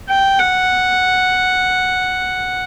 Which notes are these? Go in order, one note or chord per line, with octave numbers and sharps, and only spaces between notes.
G5
F#5